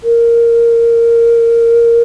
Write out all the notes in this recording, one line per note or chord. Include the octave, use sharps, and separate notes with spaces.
A#4